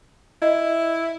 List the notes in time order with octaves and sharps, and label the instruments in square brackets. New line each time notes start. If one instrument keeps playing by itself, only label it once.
[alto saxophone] E4 [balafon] D#5